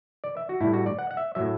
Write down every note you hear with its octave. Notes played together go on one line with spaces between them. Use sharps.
D5
E5
F#4
A2 G3 E4
F#4
D5
F#5
F#5
E5
A2 F#3 E5